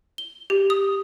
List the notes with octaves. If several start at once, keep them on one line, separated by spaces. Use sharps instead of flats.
G7
G4
D#6